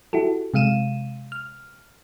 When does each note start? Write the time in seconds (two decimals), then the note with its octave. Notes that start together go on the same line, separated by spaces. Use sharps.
0.13 E4 F#4 G4 A4
0.54 C3 G#3 F5 D#7 E7
1.32 F6